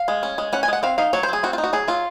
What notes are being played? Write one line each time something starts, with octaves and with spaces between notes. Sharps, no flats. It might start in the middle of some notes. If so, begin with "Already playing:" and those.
Already playing: F5
G#3
C#4
G#3
C#4 F#5
G#5
G#3 F#5
C4 F5
D#4 F5
F#3 C#5
C5
F#3 G#4
C4 F#4
F4
D#4
F#4
F#3 G#4
F#3 F4